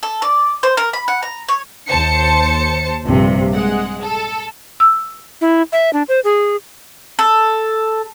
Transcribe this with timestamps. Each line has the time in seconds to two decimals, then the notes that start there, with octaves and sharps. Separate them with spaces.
0.03 A4
0.22 D5
0.63 C5
0.77 A#4
0.93 B5
1.08 F#5
1.23 A#5
1.49 C#5
1.88 D#2 C5 A5 C#7
3.04 A#1 G2 C3
3.53 G#3 F#5
4.02 A4
4.80 E6
5.41 E4
5.72 E5
5.93 D4
6.09 C5
6.24 G#4
7.19 A4